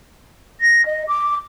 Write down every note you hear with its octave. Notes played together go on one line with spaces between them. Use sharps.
A#6
D#5
D6